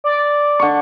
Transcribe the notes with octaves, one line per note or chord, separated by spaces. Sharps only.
D5
D3 C#6